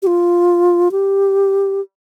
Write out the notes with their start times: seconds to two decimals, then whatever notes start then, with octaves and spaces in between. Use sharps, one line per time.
0.02 G4
0.07 F4
0.92 G4